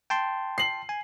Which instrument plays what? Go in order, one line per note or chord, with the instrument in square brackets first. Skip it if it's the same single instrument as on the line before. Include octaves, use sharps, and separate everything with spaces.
[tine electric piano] G5 A5 C6
[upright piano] C7 F#7
[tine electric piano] G#5